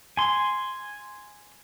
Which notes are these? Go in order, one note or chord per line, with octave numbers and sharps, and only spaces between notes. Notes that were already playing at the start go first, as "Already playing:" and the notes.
G#5 C6